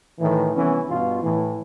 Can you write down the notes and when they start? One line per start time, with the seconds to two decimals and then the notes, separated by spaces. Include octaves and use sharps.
0.20 A2 D#3 E3
0.56 C2 E3 B3 C#4
0.90 G2 B2 F4
1.22 A2 E3